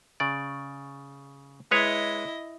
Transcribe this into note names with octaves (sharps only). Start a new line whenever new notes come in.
C#3 D5
G#3 E4 B4 C#5 D#5